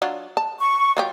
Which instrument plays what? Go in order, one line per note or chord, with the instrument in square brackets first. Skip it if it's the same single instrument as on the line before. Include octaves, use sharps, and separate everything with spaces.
[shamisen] F#3 D4 F4
A5
[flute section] C#6
[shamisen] F#3 F4 G4